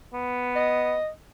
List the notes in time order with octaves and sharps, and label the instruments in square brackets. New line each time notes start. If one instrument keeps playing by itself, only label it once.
[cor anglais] B3
[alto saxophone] D#5